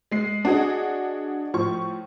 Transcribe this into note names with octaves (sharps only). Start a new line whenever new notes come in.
G#3 C7
D4 F#4 G#4 D#5
A2 F3 C#6